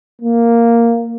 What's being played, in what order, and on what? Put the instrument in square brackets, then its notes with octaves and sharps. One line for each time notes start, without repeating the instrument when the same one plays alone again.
[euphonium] A#3